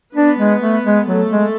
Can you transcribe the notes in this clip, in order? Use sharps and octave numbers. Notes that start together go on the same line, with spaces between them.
B3 D4 B4
G#3
A3
G#3
F#3 A3 A4
G#3